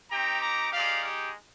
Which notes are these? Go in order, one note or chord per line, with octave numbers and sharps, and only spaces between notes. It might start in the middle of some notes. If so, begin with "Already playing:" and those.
C4 D#4 G4 G5 A#5
A#5 D6
G#3 D#4 G4 D5 F5
G4